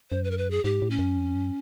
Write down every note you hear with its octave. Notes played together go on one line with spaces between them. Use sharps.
F#2 C5
B4
A#4
B4
G#4
G#2 G4
A2
C#4
F#2
F2
F#2